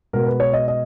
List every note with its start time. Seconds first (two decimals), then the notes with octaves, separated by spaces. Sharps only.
0.13 B2 G#3 B3 A#4
0.27 B4
0.40 C#5
0.53 D#5
0.68 D#5